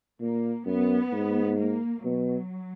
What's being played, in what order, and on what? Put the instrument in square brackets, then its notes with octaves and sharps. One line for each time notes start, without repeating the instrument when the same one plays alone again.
[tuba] A#2 [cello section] A#3
[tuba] F#2 [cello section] B3
[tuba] G#2
[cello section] A#3
[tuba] B2 [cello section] F#3